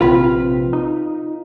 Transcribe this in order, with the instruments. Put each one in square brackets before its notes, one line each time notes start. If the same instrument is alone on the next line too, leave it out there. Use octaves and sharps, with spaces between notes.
[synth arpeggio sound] A#1 C3 C4 [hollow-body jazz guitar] F4 B4
[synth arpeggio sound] D#4